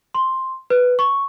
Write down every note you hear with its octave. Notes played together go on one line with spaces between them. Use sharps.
C6
B4
C#6